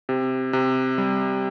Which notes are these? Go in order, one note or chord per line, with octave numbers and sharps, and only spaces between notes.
C3
C3
G3